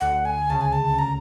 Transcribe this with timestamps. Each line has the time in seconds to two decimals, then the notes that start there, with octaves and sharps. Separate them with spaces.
0.01 D2 D3 F#5
0.25 G#5
0.49 C#2 C#3 A5
0.61 G#5
0.72 A5
0.99 A#5